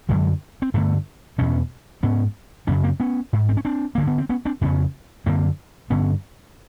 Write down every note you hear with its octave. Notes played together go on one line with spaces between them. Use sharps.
F#2 D3 F#3 G#3
C4
G2 D3 A3 B3
E2 B2 B3 C#4
G#2 B3 C#4
F#2 C#3 B3 C#4
A#3 C4
B3 C#4
G#2
C4
C#4
C4 D4
G2 D3 A#3
B3
C4
B3 C#4
C4 D4
F2 C#3 B3 C#4
F#2 D3 A#3 C4
G2 D3 B3 C#4